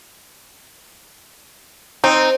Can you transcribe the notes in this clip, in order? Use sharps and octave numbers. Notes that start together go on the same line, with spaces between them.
C4 D#4